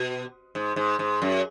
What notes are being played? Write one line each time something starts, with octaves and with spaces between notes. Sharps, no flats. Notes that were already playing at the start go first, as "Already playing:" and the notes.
Already playing: B2
G#2
G#2
G#2
F#2